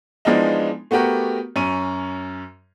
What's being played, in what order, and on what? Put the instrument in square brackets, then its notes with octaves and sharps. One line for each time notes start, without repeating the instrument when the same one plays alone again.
[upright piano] E3 F3 G#3 B3 D4 D#4
A3 B3 F#4 G4 A#4
F#2 C#4 D#7